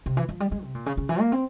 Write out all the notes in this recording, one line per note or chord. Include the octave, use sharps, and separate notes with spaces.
C3
E3
F3
G3
G#3
C3
A#2
C#3
C#3
E3
A#3
C4